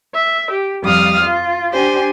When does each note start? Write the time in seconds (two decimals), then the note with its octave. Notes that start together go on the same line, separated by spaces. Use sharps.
0.14 E5
0.52 G4
0.82 F2 G3 F5 D#6 F6
1.23 F4
1.73 D4 G4 C5 G#5